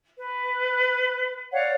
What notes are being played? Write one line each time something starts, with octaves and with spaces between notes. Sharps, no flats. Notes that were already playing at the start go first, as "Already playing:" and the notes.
B4
C#5 D5 F5 F#5